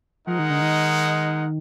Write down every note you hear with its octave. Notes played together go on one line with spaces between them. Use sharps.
F3 G#3 D#4 A#4 D#5 F#5
D#3
D3
D#3